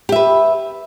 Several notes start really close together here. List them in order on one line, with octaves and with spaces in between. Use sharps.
G4 E5 B4